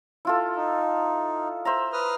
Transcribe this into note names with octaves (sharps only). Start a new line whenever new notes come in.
E4 F4 A4
D#4
C5 E5 A#5
B4 D#6 F6